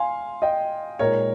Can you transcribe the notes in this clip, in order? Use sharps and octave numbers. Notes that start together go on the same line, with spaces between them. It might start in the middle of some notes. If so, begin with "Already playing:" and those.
Already playing: F5 G#5 C6
D#5 G5
A#2 G#3 D#4 A#4 C#5